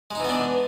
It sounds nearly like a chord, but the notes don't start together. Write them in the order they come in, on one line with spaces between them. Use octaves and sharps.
G#3 D#4 E3 B3 D4